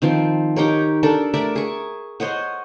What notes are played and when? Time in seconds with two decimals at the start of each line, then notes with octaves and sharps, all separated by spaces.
0.02 D#3 F3 C4
0.56 D#4 G4 A#4 C#5
1.03 D4 A4 A#4
1.33 A3 A#4 D5 E5
1.56 G#4 C#6
2.20 C5 C#5 D#5 F#5